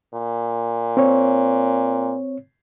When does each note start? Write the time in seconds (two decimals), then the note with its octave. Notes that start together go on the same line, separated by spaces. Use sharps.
0.14 A#2
0.97 C4 C#5